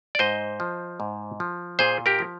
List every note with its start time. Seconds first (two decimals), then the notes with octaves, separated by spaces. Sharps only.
0.15 D5
0.19 G#2 C5 D#5
0.60 F3
1.00 G#2
1.40 F3
1.79 A#2 G#4 C5
2.06 G4 A#4
2.19 F3